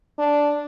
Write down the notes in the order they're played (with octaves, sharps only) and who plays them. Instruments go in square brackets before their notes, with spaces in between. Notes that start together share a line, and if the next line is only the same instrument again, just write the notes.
[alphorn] D4